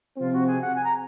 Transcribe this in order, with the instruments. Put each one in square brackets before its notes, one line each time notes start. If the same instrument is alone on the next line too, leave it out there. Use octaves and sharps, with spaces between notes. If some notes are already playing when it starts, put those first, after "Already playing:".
[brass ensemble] C3 F3 C4 [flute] F4
[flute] F#4
G#4
F#5
G#5
A#5